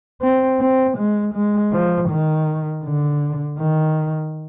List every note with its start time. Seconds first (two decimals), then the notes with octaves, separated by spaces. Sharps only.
0.22 C4
0.60 C4
0.98 G#3
1.34 G#3
1.72 F3
2.09 D#3
2.84 D3
3.59 D#3